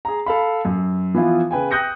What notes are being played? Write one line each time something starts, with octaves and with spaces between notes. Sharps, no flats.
G#4 A#5
A4 F5 B5
F#2
E3 F3 B3 E4 F4
C#3 B4 G5 G#5
G5 D#6 F#6 G6 A#6 C#7